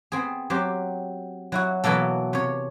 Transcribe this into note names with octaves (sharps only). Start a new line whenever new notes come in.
B3 C4 G#4
F#3 C4 G4
F#3 E4 F#4
B2 E3 F#3 A#3 A4
C3 C#5